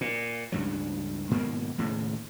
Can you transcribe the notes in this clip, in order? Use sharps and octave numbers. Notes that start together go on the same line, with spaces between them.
A#2
C#2 G2 F#3
G#2 B2 D#3 A#3
D#2 A2 C#3